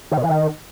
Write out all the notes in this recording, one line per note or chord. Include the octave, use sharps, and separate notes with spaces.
D#3
B2
E3
D#3